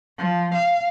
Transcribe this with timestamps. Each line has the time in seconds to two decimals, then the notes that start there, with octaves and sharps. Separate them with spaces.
0.18 F3
0.54 F5